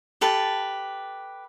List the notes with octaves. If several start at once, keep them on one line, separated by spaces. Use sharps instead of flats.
G4 A4 B4 A5